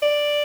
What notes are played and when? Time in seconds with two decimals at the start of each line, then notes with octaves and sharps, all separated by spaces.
0.03 D5